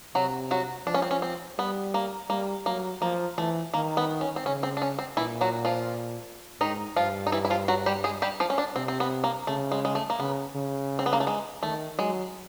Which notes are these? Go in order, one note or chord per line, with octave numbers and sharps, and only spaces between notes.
C3 F#3 F#4
F#3 F#4
F3 D4
C#4
C4
C#4
C4
G3 B3
A#3
G3 A#3
F#3 A#3
F3 A#3
E3 A3
D#3 A#3
B3
C#4
C4
C#3 C#4
C4
D4
C#4
C4
A#2 E3 E4
F#3 F#4
F3 F4
G#2 D#3 D#4
G2 F3 F4
D#4
E3 E4
E4
F3 F4
F#3 F#4
G3 G4
G#3 G#4
G3 G4
F3 F4
C#4
D4
C3 C4
C4
B3
A#3
C#3 A3
G#3
G#3
A3
A#3
C#3 B3
C#3
C4
B3
A#3
A3
G#3
D#3 A3
F#3 G#3